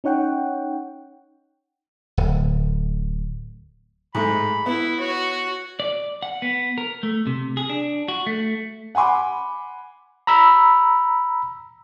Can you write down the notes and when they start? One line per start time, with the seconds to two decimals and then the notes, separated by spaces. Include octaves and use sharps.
0.04 C#4 D#4 C#5 F#5 G5
2.17 D1
4.15 G#2 G#3 A3 B5
4.66 B3 E4
5.00 F#4 C#5
5.80 D5
6.23 F#5
6.42 B3
6.78 A#4
7.03 A3
7.27 C3
7.57 G#4
7.69 D4
8.08 F#4
8.27 A3
8.95 F#5 G#5 B5 C6 D6
10.27 A#5 B5 E6